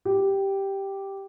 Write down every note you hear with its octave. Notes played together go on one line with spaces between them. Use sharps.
G4